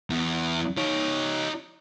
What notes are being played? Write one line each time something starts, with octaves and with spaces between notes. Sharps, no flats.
E2
D#4 C#5